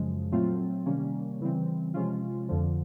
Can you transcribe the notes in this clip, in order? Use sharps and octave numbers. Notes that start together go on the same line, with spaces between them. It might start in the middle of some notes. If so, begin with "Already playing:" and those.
Already playing: F#2 C#3 F3 G#3
A#2 F#3 A3 C4 F4
C3 D#3 G3 A#3 C#4
C#3 E3 G3 C4
C3 F3 G#3 C#4 F4
F2 D3 F3